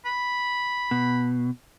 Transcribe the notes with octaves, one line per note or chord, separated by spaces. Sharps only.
B5
B2